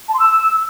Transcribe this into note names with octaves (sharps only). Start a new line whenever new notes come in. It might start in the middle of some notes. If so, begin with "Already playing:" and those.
A5
C6
E6